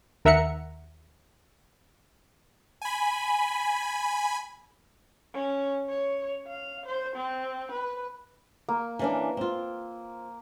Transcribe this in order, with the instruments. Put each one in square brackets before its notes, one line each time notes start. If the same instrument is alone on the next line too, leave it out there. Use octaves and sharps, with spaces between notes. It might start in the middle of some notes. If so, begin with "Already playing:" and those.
[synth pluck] D#2 A#4 E5 F#5 A#5 C#7
[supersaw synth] G#5 B5
[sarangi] C#4
C#5
F5
C5
C4
B4
[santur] A#3
[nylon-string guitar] E3 C#4 D4
C4 F4